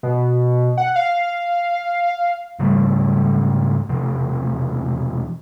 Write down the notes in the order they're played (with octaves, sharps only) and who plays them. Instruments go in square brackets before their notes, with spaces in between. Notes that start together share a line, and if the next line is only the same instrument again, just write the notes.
[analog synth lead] B2
F#5
F5
[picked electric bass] G#2 C#3 G3 A3
E1 C3 F3